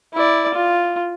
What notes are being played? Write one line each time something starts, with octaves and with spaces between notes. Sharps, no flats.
E4 D5
F4